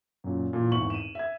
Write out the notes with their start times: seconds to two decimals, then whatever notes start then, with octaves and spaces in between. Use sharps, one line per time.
0.24 F#2 A#2
0.52 A#1 A#2 E3
0.71 G#1 E2 C#6 F#7
0.90 D#7 E7
1.15 E5 G#6